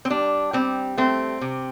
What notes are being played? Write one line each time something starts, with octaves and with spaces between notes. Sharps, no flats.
C4
G3 D4
G3 C4
A3 C4
C3